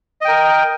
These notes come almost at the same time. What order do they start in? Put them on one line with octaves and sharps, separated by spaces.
D#5 G5 A#4